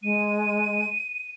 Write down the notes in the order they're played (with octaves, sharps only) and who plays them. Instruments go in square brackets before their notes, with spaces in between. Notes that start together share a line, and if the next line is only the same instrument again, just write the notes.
[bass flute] G#3 [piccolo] D#7